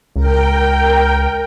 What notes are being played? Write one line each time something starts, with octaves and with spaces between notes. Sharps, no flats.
C#2 A#4 G5